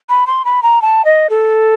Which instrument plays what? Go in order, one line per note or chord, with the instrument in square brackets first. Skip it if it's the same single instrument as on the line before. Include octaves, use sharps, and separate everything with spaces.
[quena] B5
C6
B5
A#5
A5
D#5
A4